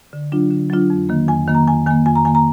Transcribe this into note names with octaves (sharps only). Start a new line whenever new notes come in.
D3
F#3 D4 F4
D3
F#3 D4 F4
F2
D#3 A#3
F2 G#5
D#3 A#3
A#5
F2 G#5
D#3 A#3 G#5
F2 G#5
A#5
D#3 A#3 G#5
A#5